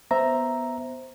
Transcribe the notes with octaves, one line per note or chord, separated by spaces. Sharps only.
B3 C5 E5 A#5